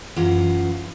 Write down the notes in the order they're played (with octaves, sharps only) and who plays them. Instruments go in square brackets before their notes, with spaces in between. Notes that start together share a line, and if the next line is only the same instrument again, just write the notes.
[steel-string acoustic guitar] F#2 E3 F4 F#5